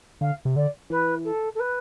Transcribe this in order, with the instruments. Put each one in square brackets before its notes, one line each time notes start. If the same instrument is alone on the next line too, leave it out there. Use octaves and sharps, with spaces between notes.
[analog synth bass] D3 [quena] F5
[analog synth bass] C3
[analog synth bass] D3 [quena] D5
[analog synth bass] E3 [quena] B4
[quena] A4
A4
B4